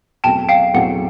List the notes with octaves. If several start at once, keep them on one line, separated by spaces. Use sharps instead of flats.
E2 B2 F#3 A3 C4 G5 A5
F5 G5
E2 B2 F#3 A3 C4 F#5